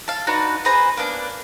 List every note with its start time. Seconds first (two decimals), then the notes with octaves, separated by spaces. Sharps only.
0.08 A4 F5
0.27 D4 D#4 F#4 B4
0.65 G#4 B4 C5 A#5
0.97 A#3 B3 D4